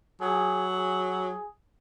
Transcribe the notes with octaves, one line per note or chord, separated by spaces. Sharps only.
F#3 G#4
G#4